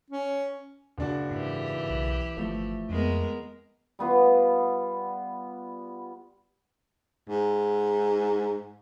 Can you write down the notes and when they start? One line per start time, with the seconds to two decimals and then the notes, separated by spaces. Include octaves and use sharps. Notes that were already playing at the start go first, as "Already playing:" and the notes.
0.10 C#4
0.98 F#1 D4 F#4
1.31 G#2 E3 G4
1.90 B1
2.37 G1 F3 A3
2.89 F2 G#3 B3 A#4
3.99 G3 B3 F4
7.29 G#2